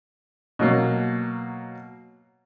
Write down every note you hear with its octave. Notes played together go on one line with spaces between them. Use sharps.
B2 F#3 A#3